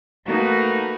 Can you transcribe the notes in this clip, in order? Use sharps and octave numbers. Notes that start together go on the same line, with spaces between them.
A3 A#3 D#4 F#4 A#4 B4